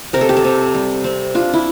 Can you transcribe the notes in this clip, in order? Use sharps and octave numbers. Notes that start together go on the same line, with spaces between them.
C3 A#4
A4
G4
A4
C3
G3
C4
D4 F4
E4